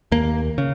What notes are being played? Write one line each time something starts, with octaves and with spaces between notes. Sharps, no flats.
D#2 A#3
C#3